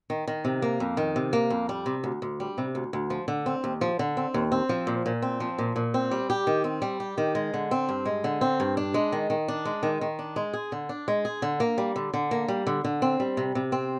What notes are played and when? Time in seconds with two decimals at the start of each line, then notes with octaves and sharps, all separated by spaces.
0.10 D#3
0.28 D#3
0.45 C3
0.62 A#3
0.80 F2
0.97 D#3
1.16 C3
1.33 A#3
1.50 F2
1.69 G3
1.86 C3
2.04 D2
2.22 D2
2.40 G3
2.58 C3
2.75 D2
2.93 D2
3.10 F3
3.28 D3
3.46 C4
3.64 D#2
3.81 F3
3.99 D3
4.17 C4
4.34 D#2
4.52 C4
4.69 F3
4.87 A#2
5.06 A#2
5.22 C4
5.40 F3
5.59 A#2
5.76 A#2
5.94 C4
6.11 G3
6.30 G4
6.47 D#3
6.64 C4
6.82 G3
7.00 G4
7.18 D#3
7.35 G#3
7.54 D3
7.71 C4
7.89 G2
8.06 G#3
8.24 D3
8.41 C4
8.60 G2
8.77 D4
8.94 G#3
9.12 D#3
9.30 D#3
9.48 D4
9.65 G#3
9.83 D#3
10.01 D#3
10.19 D4
10.36 G#3
10.53 G#4
10.72 D3
10.89 D4
11.08 G#3
11.25 G#4
11.42 D3
11.60 A#3
11.78 G3
11.96 D3
12.14 D3
12.31 A#3
12.48 G3
12.67 D3
12.84 D3
13.02 C4
13.20 G3
13.37 C3
13.55 C3
13.72 C4